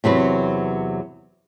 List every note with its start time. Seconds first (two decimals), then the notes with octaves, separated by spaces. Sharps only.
0.04 E2 C3 F#3 B4